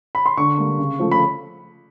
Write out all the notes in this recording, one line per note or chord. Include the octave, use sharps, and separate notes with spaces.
B5
C6
D3 C#6
G3 A#3
C#3
F3 A3
B5